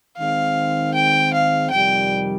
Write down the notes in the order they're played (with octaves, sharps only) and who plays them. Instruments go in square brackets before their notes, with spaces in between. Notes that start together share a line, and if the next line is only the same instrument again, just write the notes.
[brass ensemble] D#3 G#3 C4 [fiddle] F5
[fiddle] G5
F5
[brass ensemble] F2 C3 D#3 G3 [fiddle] G5